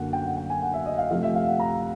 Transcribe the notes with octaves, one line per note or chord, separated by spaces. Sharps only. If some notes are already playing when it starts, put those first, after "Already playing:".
Already playing: F#2 D3 A#3 F#5
G5
F#5
G5
G#5
F#5
E5
D#5
F5
C3 F3 A3 F5
E5
F5
F#5
A#5